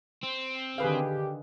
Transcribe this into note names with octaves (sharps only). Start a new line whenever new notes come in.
C4
D3 D#3 G4 G#4 B4 F5